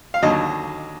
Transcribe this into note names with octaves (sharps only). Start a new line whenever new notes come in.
F5
D#2 D3 F#3 D#5